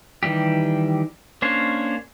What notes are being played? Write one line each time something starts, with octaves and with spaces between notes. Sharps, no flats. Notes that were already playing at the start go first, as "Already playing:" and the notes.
D#3 E3 G3 G4
A#3 C#4 D4 C5 C#5